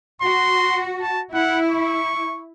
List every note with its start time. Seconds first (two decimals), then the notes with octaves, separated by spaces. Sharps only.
0.22 F#4 C6
1.01 A5
1.34 E4 F#5
1.71 C#6